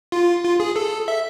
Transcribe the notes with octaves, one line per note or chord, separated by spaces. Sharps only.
F4
F4
G#4
A4
E5